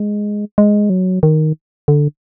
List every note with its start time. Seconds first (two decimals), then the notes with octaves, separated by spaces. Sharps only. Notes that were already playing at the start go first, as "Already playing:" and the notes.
Already playing: G#3
0.58 G#3
0.90 F#3
1.23 D#3
1.88 D3